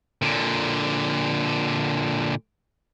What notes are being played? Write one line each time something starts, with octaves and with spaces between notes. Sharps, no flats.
A#2 D3